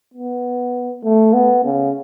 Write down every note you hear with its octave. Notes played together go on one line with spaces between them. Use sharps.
B3
A3
B3
C#3